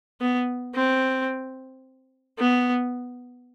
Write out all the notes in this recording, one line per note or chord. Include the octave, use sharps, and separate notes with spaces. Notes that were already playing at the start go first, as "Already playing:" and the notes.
B3
C4
B3